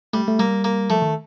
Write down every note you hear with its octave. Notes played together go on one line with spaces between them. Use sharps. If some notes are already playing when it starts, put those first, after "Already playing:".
G3 A3
A3
G3 A#3
A#3
F3 A3
D#3